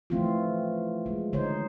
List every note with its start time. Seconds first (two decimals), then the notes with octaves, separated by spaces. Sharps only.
0.10 E3 F3 A3 C4 C#4 F4
1.06 G#3
1.33 D3 D#4 C5 C#5